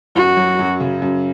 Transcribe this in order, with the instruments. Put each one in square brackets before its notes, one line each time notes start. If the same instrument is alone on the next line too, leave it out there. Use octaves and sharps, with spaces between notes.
[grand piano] F#2 [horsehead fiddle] F#4
[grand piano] F#3
F#2
C#3
F#2